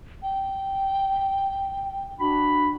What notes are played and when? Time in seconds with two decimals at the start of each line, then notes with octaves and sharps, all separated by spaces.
0.23 G5
2.20 D4 F#4 B5